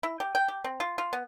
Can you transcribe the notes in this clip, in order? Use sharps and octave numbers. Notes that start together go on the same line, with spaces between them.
E4
G4
G5
G4
C4
F4
F4
B3